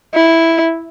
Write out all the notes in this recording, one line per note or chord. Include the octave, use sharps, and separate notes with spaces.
E4